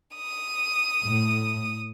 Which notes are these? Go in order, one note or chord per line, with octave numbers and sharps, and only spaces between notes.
D#6
A2